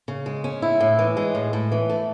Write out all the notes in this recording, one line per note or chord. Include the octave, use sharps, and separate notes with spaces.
C#3
G#3
C#4
E4
A2
E3
G#3
A2
A2
E3
A3